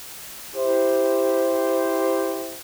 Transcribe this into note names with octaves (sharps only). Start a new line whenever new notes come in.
E4 G4 C5